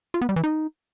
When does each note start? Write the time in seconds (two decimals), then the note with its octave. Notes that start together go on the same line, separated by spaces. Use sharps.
0.14 F4
0.21 B3
0.29 G3
0.36 E3
0.44 D#4